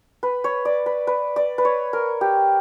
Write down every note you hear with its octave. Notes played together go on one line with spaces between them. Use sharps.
B4
C#5
D5
B4
B4
D5
B4
C#5
A#4
G4